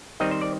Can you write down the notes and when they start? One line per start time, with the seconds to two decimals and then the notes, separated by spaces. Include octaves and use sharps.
0.20 D#3 G3 C4 D#4 D#5
0.31 C5
0.41 D5